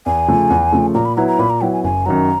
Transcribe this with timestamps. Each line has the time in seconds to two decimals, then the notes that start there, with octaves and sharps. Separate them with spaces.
0.06 E2 G#5
0.28 C#3 F3 A3
0.50 E2
0.72 C#3 F3 A3
0.95 A#2 A#5
1.05 B5
1.16 F#3 B3 E4 A#5
1.28 A#5
1.39 A#2 B5
1.50 A#5
1.61 F#3 B3 E4 G5
1.73 G#5
1.84 F#1 G#5
2.06 F#2 D#3 F#3 A#5